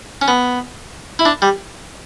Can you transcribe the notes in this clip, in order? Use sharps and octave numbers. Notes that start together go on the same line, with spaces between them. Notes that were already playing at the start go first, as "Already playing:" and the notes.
C#4
B3
E4
D4
G3